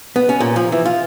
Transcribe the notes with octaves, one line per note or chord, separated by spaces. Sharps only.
B3
C#4
A#2
F3
E3
F4